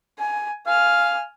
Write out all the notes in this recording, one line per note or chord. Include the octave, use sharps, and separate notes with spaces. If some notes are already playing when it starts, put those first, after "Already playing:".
G#5
F5 G#5 F6